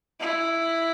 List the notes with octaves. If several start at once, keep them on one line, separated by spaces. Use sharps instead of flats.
E4